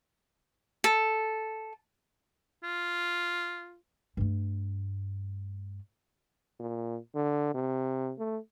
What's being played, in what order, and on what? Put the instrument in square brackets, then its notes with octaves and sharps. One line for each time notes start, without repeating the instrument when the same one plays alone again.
[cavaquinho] A4
[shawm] F4
[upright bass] G2 A3
[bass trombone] A#2
D3
C3
A3